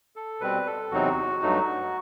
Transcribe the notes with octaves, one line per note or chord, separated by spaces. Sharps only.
A4
B2 G3 C4 B4
A4
E2 C3 F#3 C4 D#4 F#4
G2 F#3 A3 D#4